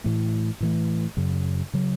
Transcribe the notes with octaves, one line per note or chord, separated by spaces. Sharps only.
A2 E3 A3
A2 E3 A3
F#2 C#3 F#3
C#3 F#3